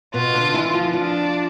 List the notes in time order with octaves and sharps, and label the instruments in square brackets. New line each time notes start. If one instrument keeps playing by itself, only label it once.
[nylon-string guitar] B2 B3 [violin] F4
[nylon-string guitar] D3 D4
E3 E4
F3 F4
[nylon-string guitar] F3 F4 [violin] D4